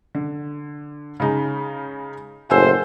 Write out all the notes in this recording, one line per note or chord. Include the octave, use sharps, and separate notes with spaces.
D3
C#3 G#3 D#4
F#1 A2 C5 F#5 G#5 E6